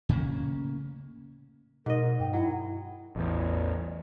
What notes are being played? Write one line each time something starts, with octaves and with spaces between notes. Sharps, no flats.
A2 C#3 A#3 C#4
G#2 B2 A#4 D#5
G2 G5
F#3 E4
A1 E2